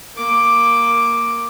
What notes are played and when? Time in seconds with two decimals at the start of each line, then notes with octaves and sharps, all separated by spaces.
0.16 A#3 D6